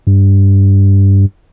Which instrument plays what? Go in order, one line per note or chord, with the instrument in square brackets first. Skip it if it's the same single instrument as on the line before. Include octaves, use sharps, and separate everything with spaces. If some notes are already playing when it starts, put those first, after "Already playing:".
[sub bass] G2